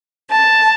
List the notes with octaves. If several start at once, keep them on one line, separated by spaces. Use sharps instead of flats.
A5